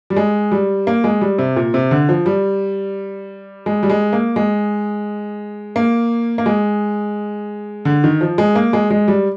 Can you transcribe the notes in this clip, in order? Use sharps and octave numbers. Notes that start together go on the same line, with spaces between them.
G3
G#3
G3
A#3
G#3
G3
C3
A#2
C3
D3
F3
G3
G#3
G3
G#3
A#3
G#3
A#3
A#3
G#3
D3
D#3
F3
G#3
A#3
G#3
G#3
G3